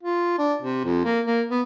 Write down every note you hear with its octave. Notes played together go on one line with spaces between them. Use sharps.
F4
D4
C3
F2
A#3
A#3
B3